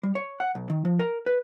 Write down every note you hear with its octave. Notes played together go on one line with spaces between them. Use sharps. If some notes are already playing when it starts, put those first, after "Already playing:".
G3
C#5
F#5
B1
D#3
F3
A#4
B4